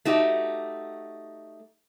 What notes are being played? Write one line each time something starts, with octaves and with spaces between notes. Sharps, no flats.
A3 D#4 F#4 G4